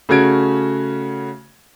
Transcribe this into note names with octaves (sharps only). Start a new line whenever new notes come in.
C#3 A3 C#4 F#4 G#6 D7